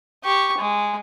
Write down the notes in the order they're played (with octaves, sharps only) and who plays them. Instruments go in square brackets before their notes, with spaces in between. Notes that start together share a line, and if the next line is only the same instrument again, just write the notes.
[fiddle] G4 C#6
G#3